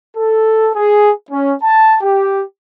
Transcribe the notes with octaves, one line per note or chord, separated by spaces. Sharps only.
A4
G#4
C#4
A5
G4